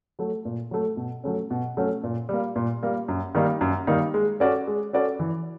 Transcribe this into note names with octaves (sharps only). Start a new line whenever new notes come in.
F#3 A3
A#2
F#3 A3
B2
F#3 A3 C#4
B2
F#3 A3 C#4
A#2
G3 A#3
A#2
G3 A#3
F#2
D#3 G3 A#3 D#4
F#2
D#3 G3 A#3 D#4
G#3
C#4 F#4 A4 D5
G#3
C#4 F#4 A4 D5
E3